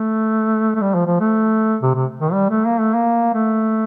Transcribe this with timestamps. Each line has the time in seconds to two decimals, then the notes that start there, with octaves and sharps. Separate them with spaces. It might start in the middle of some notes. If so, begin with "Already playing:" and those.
Already playing: A3
0.75 A3
0.81 G3
0.94 F3
1.06 F3
1.20 A3
1.82 C3
1.95 C3
2.20 D#3
2.33 G3
2.50 A3
2.66 A#3
2.80 A3
2.94 A#3
3.34 A3